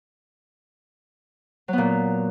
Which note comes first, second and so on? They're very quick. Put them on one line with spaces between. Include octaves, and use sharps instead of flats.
F#3 B3 A#2